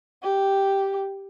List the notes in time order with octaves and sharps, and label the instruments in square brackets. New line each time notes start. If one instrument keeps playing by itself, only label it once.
[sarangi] G4